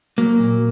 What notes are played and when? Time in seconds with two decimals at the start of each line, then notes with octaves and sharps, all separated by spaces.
0.18 F#3 A#3
0.40 A#2